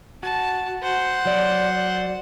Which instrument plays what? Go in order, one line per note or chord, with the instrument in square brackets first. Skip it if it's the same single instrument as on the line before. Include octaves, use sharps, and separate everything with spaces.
[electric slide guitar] F#4 [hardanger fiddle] A5
[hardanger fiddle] C5 F#5
[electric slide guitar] F#3 D5